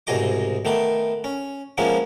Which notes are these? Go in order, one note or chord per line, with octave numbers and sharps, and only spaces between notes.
C2 G#2 B2 G#4 D#5 D6
D#3 A3 B3 D6
C#4
F3 G#3 A#3 B3 C#4 E4